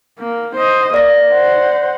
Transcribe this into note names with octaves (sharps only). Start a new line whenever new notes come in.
A#3
C5 D#5
A#3 D5 A#6
C5 F#5